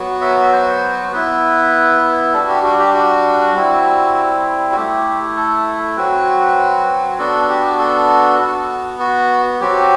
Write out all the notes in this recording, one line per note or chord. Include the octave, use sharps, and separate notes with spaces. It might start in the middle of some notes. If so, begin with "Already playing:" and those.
Already playing: F#3 B3 F#4
E5
C5
B3 E4 B4
G3 D4 F#4 A4
G4
F#4
G4
F#4
G3 C4 E4
F#4
A3 E4 G4
A4
F#3 C4 F#4 B4
B3 D4 F#4 A4
G4
A4
B3 F#4
F#4
F#3 C4 F#4 G4